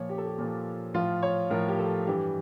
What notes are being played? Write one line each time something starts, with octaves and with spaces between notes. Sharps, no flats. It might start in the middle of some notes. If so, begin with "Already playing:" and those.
Already playing: A#2 F3 C#5
G4
A4
G4
A#2 F3
A2 F3 F4
C#5
A2 F3 A#4
G4
A4
G2 E3 G3 G4